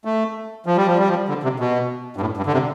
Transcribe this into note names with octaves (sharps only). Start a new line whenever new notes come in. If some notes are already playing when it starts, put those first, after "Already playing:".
A3
F3
G3
F3
G3
F3
D3
C3
B2
G2
A2
G2
D3
C3